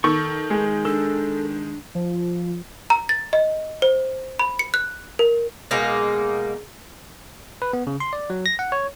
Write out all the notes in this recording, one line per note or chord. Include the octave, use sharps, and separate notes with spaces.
D#3 A4 C#6
G#3
D4 A4
F3
A#5
A6
D#5
C5
B5
C#7
F#6
A#4
B2 G#3 A#3 D#4
B4
B3
C#3
C6
D5
F#3
A#6
F#5
C#5